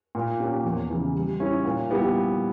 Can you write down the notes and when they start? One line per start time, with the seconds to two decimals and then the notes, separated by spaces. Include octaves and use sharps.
0.15 A#2
0.40 A#3 C#4 G4
0.65 E2
0.90 C#3 E3
1.14 G3
1.40 C#4 E4
1.65 A#2
1.90 G3 B3 E4 G4